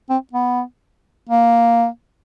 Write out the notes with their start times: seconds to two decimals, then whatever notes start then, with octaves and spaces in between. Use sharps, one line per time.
0.10 C4
0.33 B3
1.29 A#3